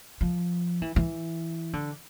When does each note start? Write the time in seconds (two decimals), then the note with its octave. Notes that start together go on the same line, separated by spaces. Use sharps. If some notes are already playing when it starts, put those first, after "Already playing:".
0.21 F3
0.82 E3
0.96 E3
1.73 D3